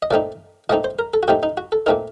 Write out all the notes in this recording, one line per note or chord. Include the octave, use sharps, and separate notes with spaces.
D#5
A#2 A3 C4 D#4 D5
A#2 A3 C4 D#4 D#5
C5
A#4
A4
F#4
A#2 A3 C4 D#4 G4
D#4
F#4
A4
A#2 A3 C4 D#4 A#4